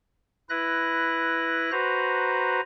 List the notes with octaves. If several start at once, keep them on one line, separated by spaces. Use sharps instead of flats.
E4 B4 F#6 A#6
F#4 B4 C5 A#5